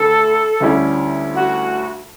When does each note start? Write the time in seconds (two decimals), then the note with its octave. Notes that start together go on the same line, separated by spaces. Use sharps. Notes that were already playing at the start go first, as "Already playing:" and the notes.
Already playing: D2 D3 A4
0.60 D2 D3 G3 C#4 E4
1.35 F#4